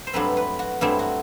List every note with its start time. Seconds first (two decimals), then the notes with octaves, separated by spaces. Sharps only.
0.07 C5
0.13 G2 F#3 A3 C4 B4
0.37 B4
0.59 F#4
0.81 G2 F#3 A3 C4 E4
0.99 F#4